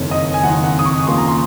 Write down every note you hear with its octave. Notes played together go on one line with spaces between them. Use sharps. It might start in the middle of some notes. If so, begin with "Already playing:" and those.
Already playing: F#1 F2 D#3 C#5
D#5
G#5
F#1 F2 D#3 F#5
F#5
D#6
C#6
D#2 C#3 F3 A#3 C6
A#5
C6